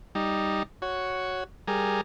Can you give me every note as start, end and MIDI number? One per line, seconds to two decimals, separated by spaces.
0.15 0.63 55
0.15 0.63 63
0.82 1.44 66
0.82 1.44 73
1.68 2.01 55
1.68 2.01 68
1.68 2.01 70